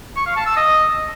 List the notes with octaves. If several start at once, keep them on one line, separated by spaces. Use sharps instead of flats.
C#6
F5
A5
E6
D#5